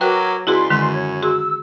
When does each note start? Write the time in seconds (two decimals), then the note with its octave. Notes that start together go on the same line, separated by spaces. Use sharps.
0.01 F#3 F#4 A#4 B4 C#5 G5 D6
0.47 C#2 E4 F#4 G#4 B4 D5 C6
0.70 F#2 D3 D#3 G#3
0.92 C#5
1.22 F#4 G#4 C6 E6